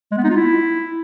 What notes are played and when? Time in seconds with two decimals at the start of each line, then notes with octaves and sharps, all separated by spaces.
0.11 G#3
0.18 B3
0.24 D#4
0.30 F4
0.36 E4